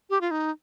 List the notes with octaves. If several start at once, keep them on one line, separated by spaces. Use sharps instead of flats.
G4
F4
D#4